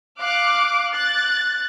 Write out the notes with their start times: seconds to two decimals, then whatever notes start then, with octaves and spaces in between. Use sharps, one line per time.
0.18 F5 D6 F#6
0.93 F#6 A6